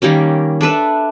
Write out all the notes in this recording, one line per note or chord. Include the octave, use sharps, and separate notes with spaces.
D#3 G3 A#3 C#4
D4 A4 B4 E5